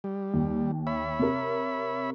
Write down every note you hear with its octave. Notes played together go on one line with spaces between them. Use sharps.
G3
D#2
C#5 E5 B5
C3 A#4